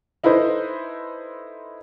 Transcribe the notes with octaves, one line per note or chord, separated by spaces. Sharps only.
D#4 E4 A4 B4 C5 D#5